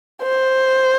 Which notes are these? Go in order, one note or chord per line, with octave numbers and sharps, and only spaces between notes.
C5